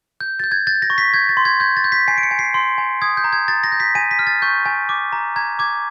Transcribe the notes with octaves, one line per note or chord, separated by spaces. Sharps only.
G6
G6 A6
G#6
G6 A6
A#6
C#6
B6
G6 G#6
A6
C6
G#6
G6 G#6
A6
G6
B6
G#5 C7
D7
C#7
G#5
C7
C6
G#5
D#6 G#6
G6
A#5
G#6
A#5 A6
A#6
G6
B6
G#5 D#7
B6
F6
A6
C#6 G6
G#5
D6
A#5
A#5 G#6
D6 G#6